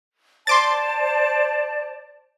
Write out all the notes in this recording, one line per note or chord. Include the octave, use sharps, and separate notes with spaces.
C5 D5 A5 C6 D6 A6